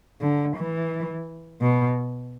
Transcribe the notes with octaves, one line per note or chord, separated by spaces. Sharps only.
D3
E3
B2